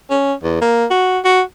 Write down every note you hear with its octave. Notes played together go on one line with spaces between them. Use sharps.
C#4
E2
A#3
F#4
F#4